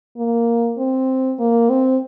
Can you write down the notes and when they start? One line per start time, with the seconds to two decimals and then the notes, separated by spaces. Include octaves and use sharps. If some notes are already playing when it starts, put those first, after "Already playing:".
0.17 A#3
0.78 C4
1.39 A#3
1.70 C4